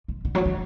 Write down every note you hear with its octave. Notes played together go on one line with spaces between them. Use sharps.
C3
D3
F#3
D#3